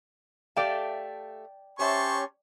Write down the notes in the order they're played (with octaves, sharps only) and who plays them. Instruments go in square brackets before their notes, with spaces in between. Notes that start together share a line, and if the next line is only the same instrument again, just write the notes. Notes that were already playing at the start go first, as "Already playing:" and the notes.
[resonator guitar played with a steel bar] A3 G4 F5 [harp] D5 G5 A5
[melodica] C#4 G4 C#5 [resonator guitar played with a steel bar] C5 E5 [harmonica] A5 C6 C#6